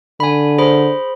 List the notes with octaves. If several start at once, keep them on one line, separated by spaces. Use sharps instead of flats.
D3 G#5 B5
G#4 C5 B5